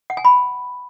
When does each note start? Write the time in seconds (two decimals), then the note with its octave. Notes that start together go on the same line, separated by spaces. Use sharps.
0.10 F#5
0.17 G#5
0.25 B5